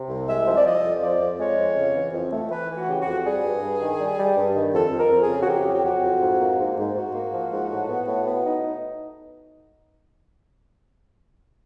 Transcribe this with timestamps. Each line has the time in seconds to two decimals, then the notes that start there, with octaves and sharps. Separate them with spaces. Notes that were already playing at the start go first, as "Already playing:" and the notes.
Already playing: C3
0.09 C2
0.28 G#3 E5
0.46 F3
0.56 D5
0.65 F3 D#5
0.84 F2
1.02 F3 D5
1.22 F2
1.39 G#3 C#5
1.58 F2
1.77 C#3
1.95 E3
2.13 F2
2.32 A3
2.51 E3 B4
2.70 E3
2.76 F#4
2.88 C#3 G4
3.00 F#4
3.07 F2
3.25 G3 G#4
3.44 G2
3.62 G2
3.81 D#3
3.99 G3
4.18 G3
4.37 G2
4.55 D#3
4.74 F2 A4
4.92 F2
4.99 A#4
5.11 F2
5.22 G#4
5.29 C#3
5.42 F#4
5.47 F2 G4
5.67 F#3
5.73 G4
5.84 F2 F#4
6.03 F2
6.21 G#2
6.40 A#3
6.59 G#2
6.78 G#2
6.95 G#2 F#4
7.14 A#3
7.34 F3
7.52 G#2
7.71 A2
7.89 B3
8.08 A2
8.27 B3
8.45 D#4